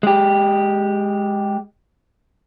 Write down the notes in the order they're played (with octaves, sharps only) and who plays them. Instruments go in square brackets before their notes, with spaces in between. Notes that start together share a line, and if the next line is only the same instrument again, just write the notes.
[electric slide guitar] G#3 G4